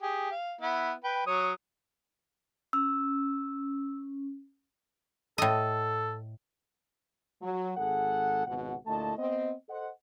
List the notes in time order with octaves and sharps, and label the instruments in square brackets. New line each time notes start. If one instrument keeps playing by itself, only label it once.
[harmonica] G4 G#4
F5
B3 E4
B4 G5
F#3 C#5 D#6
[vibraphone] C#4 [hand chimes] E6
[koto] A2 D#5 [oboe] A4
[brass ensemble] F#3
G#1 G#4 A4 F#5
G#1 C#2 B2 F#5
D2 A#2 A3 E4 D#5 A5
B3 C4 D#5
A4 C5 D#5 F#5